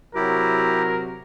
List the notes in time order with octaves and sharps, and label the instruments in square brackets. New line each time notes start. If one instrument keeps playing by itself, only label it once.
[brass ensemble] C3 F#3 [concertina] E4 G4 [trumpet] A#4